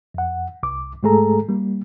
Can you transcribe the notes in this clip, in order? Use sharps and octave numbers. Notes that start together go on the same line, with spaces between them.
F2 F#5
C2 D6
G#2 G#3 A3 G#4 A4 A#5
G3 A#3